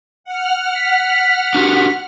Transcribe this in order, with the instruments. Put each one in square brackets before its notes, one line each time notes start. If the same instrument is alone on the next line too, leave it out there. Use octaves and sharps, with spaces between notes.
[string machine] F#5 F6
[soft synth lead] B6
[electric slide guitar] D4 F#4 G4